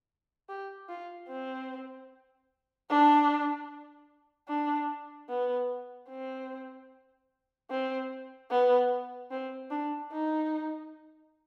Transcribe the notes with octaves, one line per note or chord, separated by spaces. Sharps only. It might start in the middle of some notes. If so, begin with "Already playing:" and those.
G4
F4
C4
D4
D4
B3
C4
C4
B3
C4
D4
D#4